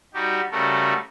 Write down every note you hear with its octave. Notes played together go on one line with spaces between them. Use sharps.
G3 D#4 F#4 G4
C#3 G3 A3 F#4 A4 A#4